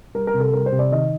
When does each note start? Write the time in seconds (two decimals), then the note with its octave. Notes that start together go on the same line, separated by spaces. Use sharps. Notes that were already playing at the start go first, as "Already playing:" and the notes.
0.15 G3 A#4
0.27 A#4
0.34 C3
0.40 A4
0.53 G3 A#4
0.66 C5
0.72 C3
0.79 D5
0.92 D#3 D#5